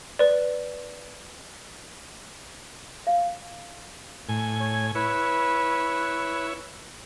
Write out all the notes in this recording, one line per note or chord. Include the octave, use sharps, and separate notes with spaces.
B4 D5
F5
A2 G#5
C#5
E4 B4 C#5